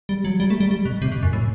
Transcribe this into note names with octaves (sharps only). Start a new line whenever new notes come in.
G3
F#3
G3
A3
G3
G3
B2
C3
B2
F#2
A2